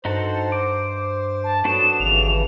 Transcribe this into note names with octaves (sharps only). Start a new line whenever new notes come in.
G2 D#4 F#4 A4 C5
D6
A5
F#3 B3 D4 F#4 A4 E7
G#1 G2 C#3 E3 F7